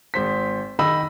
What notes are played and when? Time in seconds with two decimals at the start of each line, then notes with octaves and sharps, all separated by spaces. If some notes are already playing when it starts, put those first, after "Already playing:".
0.14 G#1 C5 B6
0.79 D#3 D#5 B5 E6 A#6